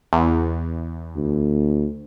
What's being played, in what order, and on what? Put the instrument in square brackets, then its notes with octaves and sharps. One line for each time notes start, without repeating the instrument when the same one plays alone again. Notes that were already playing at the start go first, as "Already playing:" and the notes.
[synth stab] E2
[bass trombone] D2